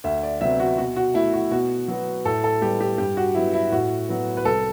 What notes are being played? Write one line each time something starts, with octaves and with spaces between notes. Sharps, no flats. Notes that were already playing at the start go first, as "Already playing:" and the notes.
D2 E5
D5
C3 F#3 B3 E5
F#4
B2 F#4
F#4
A3 E4
F#4
B2 F#4
F#3 B3
A2 A4
A4
G3 B3 G4
G4
G2 G4
F#4
F#3 B3 E4
E4
A2 F#4
F#3 B3
B4
C2 A4